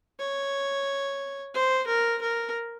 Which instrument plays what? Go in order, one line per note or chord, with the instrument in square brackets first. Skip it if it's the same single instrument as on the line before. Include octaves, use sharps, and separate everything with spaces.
[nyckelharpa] C#5
C5
A#4
A#4